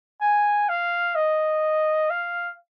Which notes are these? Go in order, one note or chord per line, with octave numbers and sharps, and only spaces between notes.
G#5
F5
D#5
F5